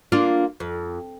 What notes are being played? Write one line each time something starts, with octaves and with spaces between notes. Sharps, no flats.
A#3 D4 F4
F2